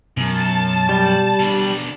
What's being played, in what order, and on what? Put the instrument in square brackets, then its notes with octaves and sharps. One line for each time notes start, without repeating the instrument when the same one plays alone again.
[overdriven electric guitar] F#2 [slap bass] B2 G#3 [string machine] A5
[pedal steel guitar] G3
[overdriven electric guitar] B2 D4